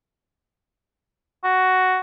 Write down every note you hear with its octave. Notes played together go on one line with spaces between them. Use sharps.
F#4